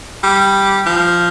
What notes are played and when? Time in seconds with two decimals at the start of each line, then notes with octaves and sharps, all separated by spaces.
0.24 G3
0.87 F3